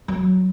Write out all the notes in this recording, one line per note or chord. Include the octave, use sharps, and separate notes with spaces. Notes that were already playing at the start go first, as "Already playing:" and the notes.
F#3